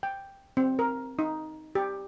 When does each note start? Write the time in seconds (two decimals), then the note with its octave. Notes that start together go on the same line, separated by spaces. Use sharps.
0.03 G5
0.57 C4
0.79 A#4
1.19 D#4
1.75 G4